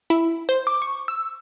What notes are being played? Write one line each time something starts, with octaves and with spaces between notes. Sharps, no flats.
E4
C5
D6
C#6
E6